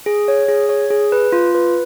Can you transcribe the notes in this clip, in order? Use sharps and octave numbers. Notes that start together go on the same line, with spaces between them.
G#4
C#5
G#4
C#5
G#4
B4
F4
B4